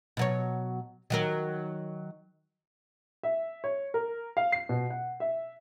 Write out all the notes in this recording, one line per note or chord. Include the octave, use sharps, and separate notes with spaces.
B2 F#3 C#5
D#3 F#3 A#4
E5
C#5
A#4
F5
C7
B2
F#5
E5